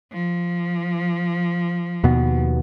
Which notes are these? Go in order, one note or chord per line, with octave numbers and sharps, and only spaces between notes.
F3
D#2 B2 B3